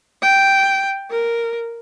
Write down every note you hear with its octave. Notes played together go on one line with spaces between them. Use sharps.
G5
A#4